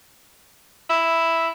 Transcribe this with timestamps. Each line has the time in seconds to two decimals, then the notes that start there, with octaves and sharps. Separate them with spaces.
0.90 E4